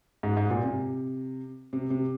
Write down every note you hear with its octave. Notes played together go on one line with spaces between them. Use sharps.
G#2
G#2
A#2
C3
C3
C3